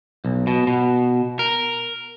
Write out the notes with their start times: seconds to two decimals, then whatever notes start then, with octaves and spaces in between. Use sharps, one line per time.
0.25 B1
0.47 B2
0.67 B2
1.39 A#4